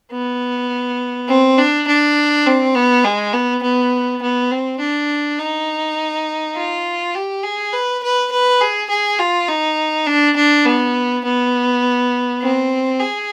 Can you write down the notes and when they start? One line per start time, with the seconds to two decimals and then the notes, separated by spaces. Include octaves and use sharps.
0.11 B3
1.28 C4
1.58 D4
1.87 D4
2.46 C4
2.75 B3
3.04 G#3
3.33 B3
3.62 B3
4.22 B3
4.51 C4
4.80 D4
5.39 D#4
6.56 F4
7.14 G4
7.43 G#4
7.73 B4
8.03 B4
8.32 B4
8.61 G#4
8.90 G#4
9.19 F4
9.48 D#4
10.06 D4
10.36 D4
10.66 B3
11.24 B3
12.41 C4
13.00 G#4